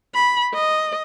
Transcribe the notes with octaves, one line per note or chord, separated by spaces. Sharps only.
B5
D#5